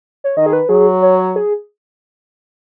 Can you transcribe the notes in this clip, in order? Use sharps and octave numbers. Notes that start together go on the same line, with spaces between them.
C#5
D#3 D#5
G#4
B4
F#3 G#4
C#5
C#5
G#4